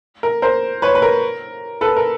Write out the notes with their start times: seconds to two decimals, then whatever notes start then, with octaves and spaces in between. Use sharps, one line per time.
0.23 A#4
0.42 A#4 C5
0.82 B4 C#5
0.95 B4
1.02 A#4
1.81 A4 B4
1.97 A#4